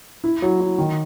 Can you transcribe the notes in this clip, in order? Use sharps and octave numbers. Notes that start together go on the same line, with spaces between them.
E4
F#3
F#3
D#3